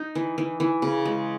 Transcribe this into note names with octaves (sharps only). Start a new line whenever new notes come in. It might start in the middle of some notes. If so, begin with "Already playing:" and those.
Already playing: D#4
E3
E3
E3
C#3
G#3